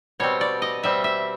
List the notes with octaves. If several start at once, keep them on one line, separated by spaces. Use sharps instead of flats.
B2 G3 C4 C#5
D5
D#5
B2 G3 C4 E5
E5